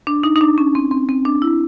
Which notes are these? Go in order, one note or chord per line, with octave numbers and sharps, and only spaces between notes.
D4
D#4
D#4
D4
C#4
C4
C4
C4
D4
E4